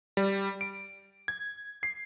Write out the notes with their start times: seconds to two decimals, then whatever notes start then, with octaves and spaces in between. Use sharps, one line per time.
0.17 G3
0.61 D7
1.28 G#6
1.83 C7